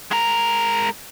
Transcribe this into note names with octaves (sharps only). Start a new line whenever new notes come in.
G#3 A#4